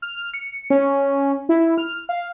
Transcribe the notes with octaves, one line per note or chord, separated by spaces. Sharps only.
F6
C#7
C#4
E4
F6
F5